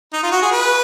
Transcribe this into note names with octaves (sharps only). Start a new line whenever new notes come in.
D#4
F4
F#4
G#4
B4